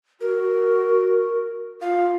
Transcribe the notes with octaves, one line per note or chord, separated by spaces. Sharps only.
F#4 A#4
F4 F5